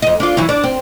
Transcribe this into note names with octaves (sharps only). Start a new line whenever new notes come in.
F2 D#5
D4 F4
E3 F#3 E4
D4
C4